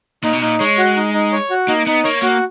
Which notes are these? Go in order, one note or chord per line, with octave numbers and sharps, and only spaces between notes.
A#2 D#4
B2
A#2 D#4
G#3 C#5
F#4
D#4
D#4
C#5
F#4
A#3 D#4
B3 D#4
A#3 C#5
A#3 F#4